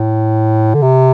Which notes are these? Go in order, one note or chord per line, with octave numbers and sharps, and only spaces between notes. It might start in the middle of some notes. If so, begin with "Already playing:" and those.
Already playing: A2
D3
C3